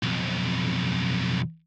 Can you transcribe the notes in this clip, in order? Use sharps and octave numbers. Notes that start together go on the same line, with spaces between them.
B1 F2